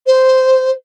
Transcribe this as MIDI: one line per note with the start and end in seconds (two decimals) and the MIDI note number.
0.06 0.70 72